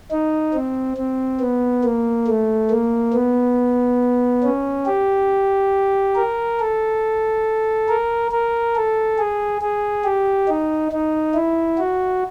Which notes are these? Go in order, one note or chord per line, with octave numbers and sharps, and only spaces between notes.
D#4
C4
C4
B3
A#3
A3
A#3
B3
C#4
G4
A#4
A4
A#4
A#4
A4
G#4
G#4
G4
D#4
D#4
E4
F#4